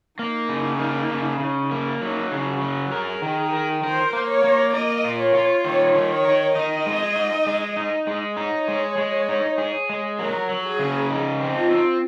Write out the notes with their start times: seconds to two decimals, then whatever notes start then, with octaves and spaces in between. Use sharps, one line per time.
0.19 A#3 D#4
0.49 C#3
0.79 A#3
1.10 C#3
1.40 C#3
1.71 A#3
2.01 F#3 D#4
2.31 C#3
2.46 F#4
2.61 F#3
2.92 G#4 A#4
3.22 D#3
3.53 A#4
3.83 A#4 C5
4.13 A#3
4.28 C#5
4.44 A#3
4.74 A#4 D#5
5.04 F4
5.19 C#5
5.35 F4
5.64 D#3 C#5
5.95 D#3
6.10 C#5
6.25 A#4
6.55 D#4 D#5
6.86 G#3
7.16 D#4
7.46 G#3
7.77 D#4
8.07 G#3
8.37 D#4 C#5
8.68 G#3
8.98 G#3
9.29 D#4
9.58 G#4
9.89 G#3
10.19 F#3 A#4
10.49 F#3
10.65 G#4
10.79 C#3
11.10 D#4
11.40 C4
11.55 F4
11.70 C4